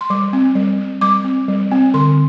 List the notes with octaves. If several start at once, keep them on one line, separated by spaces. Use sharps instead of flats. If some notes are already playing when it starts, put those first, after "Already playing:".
C6
G3 D6
C4
G3
C4
G3 D6
C4
G3
C4
D3 C6